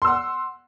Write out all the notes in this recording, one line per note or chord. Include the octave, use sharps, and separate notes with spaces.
F#5 C6 E6